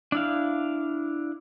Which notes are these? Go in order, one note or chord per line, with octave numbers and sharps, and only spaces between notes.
D4 E4 F5